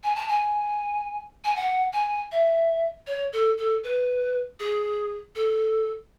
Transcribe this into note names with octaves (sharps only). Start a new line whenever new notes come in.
G#5
A5
G#5
G#5
F#5
G#5
E5
C#5
A4
A4
B4
G#4
A4